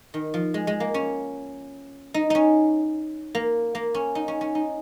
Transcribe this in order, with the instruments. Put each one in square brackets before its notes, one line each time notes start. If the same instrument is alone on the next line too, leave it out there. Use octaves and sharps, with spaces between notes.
[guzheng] D#3
F3
G#3
G#3
A#3
C#4
D#4
C#4 D#4
A#3
A#3
C#4
D#4
C#4
C#4
D#4